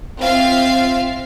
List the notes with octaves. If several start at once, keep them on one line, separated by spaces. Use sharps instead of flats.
C4 F4 E5 F5 C7